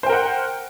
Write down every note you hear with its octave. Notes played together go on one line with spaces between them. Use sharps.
A#4 C5 F#5 G5